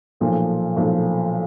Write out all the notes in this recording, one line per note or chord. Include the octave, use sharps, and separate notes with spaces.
B1 A#2 F3 A3
B1 A#2 F3 A3